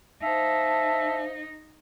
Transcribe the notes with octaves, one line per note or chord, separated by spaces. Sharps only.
D#4 C5 E5 F5 A5